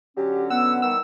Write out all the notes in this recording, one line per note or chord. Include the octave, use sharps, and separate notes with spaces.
D3 F#3 C#4 G4
B3 F#5 E6
D#3 E3 G3 E6